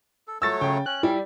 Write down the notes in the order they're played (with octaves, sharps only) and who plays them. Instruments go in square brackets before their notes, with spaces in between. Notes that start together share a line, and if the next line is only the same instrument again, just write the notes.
[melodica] A4
[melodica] F#3 A3 C#5 [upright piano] E6 A6
[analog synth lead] C#3 [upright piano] G5
[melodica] C#4 [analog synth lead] F#6
[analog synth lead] G3 [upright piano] E4